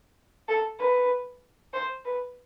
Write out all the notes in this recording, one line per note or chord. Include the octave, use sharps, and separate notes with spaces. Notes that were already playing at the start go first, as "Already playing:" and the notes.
A4
B4
C5
B4